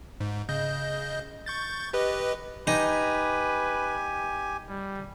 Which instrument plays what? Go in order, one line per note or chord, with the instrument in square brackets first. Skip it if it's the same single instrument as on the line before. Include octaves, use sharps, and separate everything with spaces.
[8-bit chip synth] G#2
C#3 D#5 G6
C#6 G6 A6
G4 B4 D#5
[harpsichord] D#4 D#5 [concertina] G4 G#5 [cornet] B4
[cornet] G3